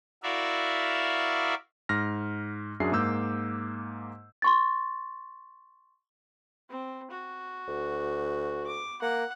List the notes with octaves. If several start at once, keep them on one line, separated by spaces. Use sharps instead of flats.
E4 F#4 A#4 D5 E5 F5
G#2 F6 A#6
F#2 D4 F#4 G#4 E5 C7
G#2 A#3 D6 E6 G6
C6 C#6 A6
C4
F#4
D2
D6
A#3 F#5